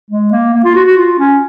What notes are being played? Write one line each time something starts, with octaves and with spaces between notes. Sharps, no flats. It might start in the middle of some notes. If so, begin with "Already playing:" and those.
G#3
A#3
A#3
F4
F#4
F#4
F4
C#4